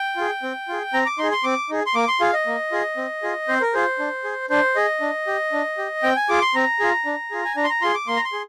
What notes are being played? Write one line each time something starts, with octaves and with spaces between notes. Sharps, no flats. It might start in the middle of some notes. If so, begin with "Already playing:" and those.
Already playing: G5
F4 G#4
C4
F4 G#4
C4 A#5
D6
D#4 G#4 C6
C6
C4 D6
D#4 G#4
C6
A#3 D6
C6
F4 G#4 F5
D#5
A#3
F4 G#4
C4
F4 G#4
C4 C5
A#4
F4 G#4 C5
D4
G#4
D4 C5
G#4 D#5
D4
G4
D4
G4
C4 G5
G#5
F4 G#4 D6
C6
C4 A#5
F4 G#4
D4
F4 G#4
G#5
D4 A#5
C6
A#5
F4 G#4 C6
D6
A#3 C6
A#5
C6
G#4